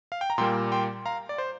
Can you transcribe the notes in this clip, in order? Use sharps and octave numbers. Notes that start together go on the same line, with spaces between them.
F5
G5
A#5
A#2 G3 A#3 G5 C6
G5 C6
F5 A#5
D5
C5